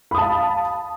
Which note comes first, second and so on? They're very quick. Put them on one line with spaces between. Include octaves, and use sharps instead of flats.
B5 D#6 A5 F5